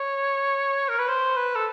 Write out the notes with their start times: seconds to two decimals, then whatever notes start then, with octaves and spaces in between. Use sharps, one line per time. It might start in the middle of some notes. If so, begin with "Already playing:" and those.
Already playing: C#5
0.89 A#4
0.99 B4
1.09 C5
1.37 B4
1.55 A4